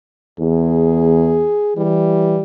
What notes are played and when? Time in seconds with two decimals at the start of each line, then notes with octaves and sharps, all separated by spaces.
0.39 E2 G#4
1.77 E3 G3